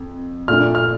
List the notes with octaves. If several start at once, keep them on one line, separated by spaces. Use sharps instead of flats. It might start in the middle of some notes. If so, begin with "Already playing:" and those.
Already playing: F2
A#2 A3 D4 F6
F6